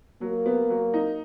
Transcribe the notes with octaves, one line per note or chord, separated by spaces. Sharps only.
F#3 A#3
B3
F#3
D#4